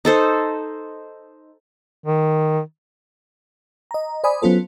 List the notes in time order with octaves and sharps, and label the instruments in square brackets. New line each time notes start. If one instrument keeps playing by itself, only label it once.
[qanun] D#4 A4 C5
[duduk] D#3
[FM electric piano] D#5 A#5
C5 D5 G#5 B5 D#6
F#3 B3 C#4 F4 A4 C5